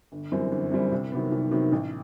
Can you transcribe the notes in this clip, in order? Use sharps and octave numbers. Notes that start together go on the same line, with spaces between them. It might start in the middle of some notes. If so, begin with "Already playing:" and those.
G1
F#2 E3 G3 C4
G1
F#2 E3 G3 C4
C2
C3 D#3 F#3 B3
C2
C3 D#3 F#3 B3
A1